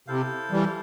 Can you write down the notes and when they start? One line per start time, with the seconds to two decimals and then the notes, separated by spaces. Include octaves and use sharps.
0.07 C3 E4 A4 C5 F5
0.51 E3 G3